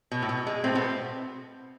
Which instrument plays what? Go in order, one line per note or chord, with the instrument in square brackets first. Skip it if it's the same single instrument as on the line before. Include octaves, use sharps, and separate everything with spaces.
[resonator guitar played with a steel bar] B2
A2
B2
G#3
[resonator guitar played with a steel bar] A2 A3 [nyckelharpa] C4
[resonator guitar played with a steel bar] B2 B3